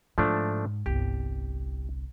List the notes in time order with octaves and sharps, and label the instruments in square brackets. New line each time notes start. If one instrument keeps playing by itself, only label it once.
[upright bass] G#2 [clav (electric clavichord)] F3 A3 D4
[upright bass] G1 C2 [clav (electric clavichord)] G4